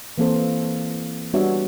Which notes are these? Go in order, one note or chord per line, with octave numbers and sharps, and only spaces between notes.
E3 A#3 C4 A4 C5
G3 B3 D4 F#4 C#5 E5